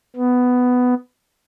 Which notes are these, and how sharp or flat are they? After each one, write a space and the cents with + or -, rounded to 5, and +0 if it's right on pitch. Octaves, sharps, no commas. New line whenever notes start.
B3 +10